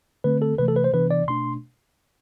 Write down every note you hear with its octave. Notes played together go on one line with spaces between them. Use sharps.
D3 A3 C4 B4
A4
C3 E3 A3 B4
A4
B4
C5
C3 E3 B3 D4 B4
D5
B2 A3 D4 C6